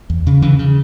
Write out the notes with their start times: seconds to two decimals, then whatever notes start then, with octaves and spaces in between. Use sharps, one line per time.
0.10 E2
0.26 C#3
0.42 C#3 E3
0.59 C#3